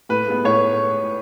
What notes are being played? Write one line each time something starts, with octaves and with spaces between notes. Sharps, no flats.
A2 B4
G#3 B3
A2 C#5